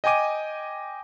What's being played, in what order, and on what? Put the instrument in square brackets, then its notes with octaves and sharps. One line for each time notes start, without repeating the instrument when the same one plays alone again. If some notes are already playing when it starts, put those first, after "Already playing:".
[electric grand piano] D#5 G5 G#5 D6 D#7